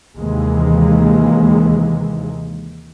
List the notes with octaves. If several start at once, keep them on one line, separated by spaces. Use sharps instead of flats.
D#2 C3 E3 G#3 A#3